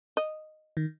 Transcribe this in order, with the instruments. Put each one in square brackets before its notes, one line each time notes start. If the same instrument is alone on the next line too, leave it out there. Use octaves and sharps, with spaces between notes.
[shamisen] D#5
[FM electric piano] D#3